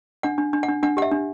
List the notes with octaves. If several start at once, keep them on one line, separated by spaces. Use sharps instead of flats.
D4 F#5
D4
D4
F#5
D4
D4 F#5
G4 F#5
E5
D4